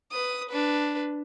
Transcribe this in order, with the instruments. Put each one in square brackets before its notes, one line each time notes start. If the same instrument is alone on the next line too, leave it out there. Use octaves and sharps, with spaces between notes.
[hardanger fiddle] B4 D#6
D4 B4